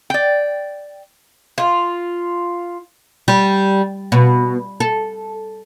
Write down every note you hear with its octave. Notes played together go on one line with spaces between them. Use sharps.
D5 G5
F4
G3
B2
A4